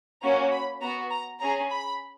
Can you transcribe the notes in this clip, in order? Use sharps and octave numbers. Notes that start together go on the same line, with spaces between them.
A#3 C#4 F#4 A#5
B5
B3 F#4 A#5
A#5
C#4 G#4 A#5
B5